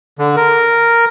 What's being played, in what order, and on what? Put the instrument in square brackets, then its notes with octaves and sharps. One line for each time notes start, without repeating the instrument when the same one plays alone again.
[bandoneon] D3
A#4